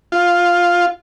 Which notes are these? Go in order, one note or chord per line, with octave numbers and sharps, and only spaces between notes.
F4